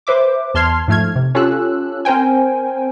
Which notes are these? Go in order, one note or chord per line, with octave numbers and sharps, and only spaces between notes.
B4 C5 E5 D6
E2 A5 C6 F6 G#6 C7
G#2 F3 A3 F6 G#6
C3
C#4 F4 G4 A4 E6 F#6
C4 A#4 C5 G5 G#5